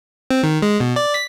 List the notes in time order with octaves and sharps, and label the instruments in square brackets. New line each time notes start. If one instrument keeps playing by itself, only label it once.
[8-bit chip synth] C4
D#3
G#3
B2
D5
B6